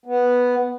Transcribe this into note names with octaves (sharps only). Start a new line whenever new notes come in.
B3